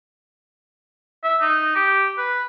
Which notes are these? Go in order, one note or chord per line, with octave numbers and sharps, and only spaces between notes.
E5
D#4
G4
B4